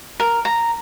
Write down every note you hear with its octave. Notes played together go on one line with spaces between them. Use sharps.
A#4
A#5